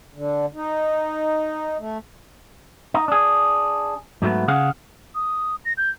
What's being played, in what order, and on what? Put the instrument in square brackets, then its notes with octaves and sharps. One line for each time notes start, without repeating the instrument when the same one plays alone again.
[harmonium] D3
D#4
A3
[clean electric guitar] D#4
D4 G#4
G#2 F#3 A3 B3
C#3 G#4 F5 F#5
[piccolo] D#6
A#6
G6